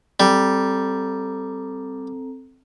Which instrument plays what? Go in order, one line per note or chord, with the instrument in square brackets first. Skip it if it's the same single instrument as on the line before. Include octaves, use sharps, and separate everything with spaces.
[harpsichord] G3 [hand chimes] C4 A4 A#5